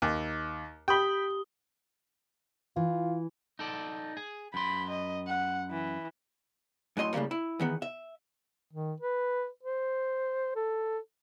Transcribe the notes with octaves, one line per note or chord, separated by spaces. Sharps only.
D#2
G4 G5 B5 D#6 G7
E3 F4
D#4 A4 D5
G#4
F#2 B5 C6
D#5
F#5
E3
F#2 A2 D#5 C6
A2 C#3 F3 G3 A#3
E4
E2 D#3 B3
E5
D#3
B4
C5
A4